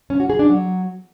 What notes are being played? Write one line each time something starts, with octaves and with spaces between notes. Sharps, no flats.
C#4
F#4
G#4
D4
F#3